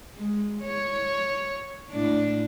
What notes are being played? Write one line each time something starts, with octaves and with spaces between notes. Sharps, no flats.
G#3
C#5
A2 D4